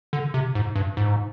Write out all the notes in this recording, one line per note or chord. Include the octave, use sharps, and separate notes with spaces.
D3
C3
G#2
G2
G#2